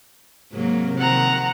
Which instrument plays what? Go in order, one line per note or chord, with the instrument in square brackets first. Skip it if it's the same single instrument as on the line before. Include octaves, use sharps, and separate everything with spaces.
[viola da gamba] G#2 F#3 A#3 [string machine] C3 A#4
[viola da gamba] D#3 F3 C4 [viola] F#5 A#5